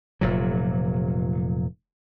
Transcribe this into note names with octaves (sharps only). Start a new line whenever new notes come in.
F1 A#2 F#3